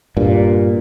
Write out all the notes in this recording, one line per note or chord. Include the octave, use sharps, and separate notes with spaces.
G2 A#2